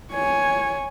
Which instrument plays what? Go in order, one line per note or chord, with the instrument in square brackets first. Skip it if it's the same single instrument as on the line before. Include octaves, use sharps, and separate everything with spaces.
[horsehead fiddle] C#5 G#5